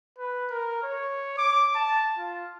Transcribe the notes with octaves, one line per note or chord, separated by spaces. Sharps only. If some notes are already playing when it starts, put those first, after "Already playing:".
B4
A#4
C#5
D6
A5
F4